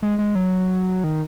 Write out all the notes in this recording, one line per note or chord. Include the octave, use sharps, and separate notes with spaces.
G#3
G#3
F#3
D#3